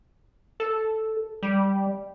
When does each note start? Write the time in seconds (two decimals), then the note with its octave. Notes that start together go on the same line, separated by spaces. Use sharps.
0.60 A4
1.43 G3